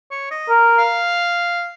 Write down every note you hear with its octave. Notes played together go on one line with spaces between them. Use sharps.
C#5
D#5
A#4
F5